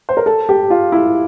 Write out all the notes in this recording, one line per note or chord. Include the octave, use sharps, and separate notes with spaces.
C5
A#4
A4
G4
F4
E4